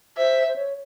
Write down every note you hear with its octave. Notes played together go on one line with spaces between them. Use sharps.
C5 E5
C5
C#5